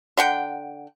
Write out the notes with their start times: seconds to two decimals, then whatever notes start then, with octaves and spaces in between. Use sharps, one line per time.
0.17 D3 F#5 G5